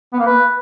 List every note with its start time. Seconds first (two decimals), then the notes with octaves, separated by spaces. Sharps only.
0.13 B3
0.19 A#3
0.26 B4